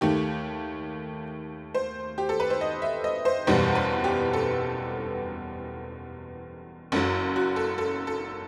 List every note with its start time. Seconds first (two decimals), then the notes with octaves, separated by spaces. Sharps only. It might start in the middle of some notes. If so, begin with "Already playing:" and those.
0.01 D#2 D#3 A3 G4
1.74 C5
2.18 G4
2.29 A4
2.40 B4
2.50 C5
2.61 D#5
2.82 E5
3.04 D#5
3.25 C5
3.47 F#1 E2 B2 G3 C5
3.75 B4
4.04 G4
4.33 A4
6.92 F#1 F#2 F#3 A4
7.36 F#4
7.56 A4
7.78 A4
8.07 A4